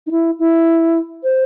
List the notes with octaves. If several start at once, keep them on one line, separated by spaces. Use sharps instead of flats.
D#4
E4
E4
C5